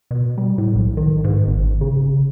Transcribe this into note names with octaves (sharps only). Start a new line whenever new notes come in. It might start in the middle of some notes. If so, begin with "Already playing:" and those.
B2
G3
A2
B1
D#3
G#2
G#1
C#3